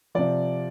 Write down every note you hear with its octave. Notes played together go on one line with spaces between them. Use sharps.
C3 F3 D5